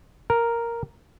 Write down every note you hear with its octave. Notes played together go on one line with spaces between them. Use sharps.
A#4